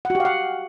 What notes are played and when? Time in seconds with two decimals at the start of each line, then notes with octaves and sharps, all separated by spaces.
0.05 F#5
0.10 F#4
0.15 G4
0.20 F5
0.25 F#5